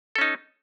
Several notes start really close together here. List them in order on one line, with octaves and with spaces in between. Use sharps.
A4 C#4 D#4